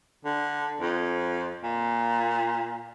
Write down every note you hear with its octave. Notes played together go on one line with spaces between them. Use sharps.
D3
F2
A#2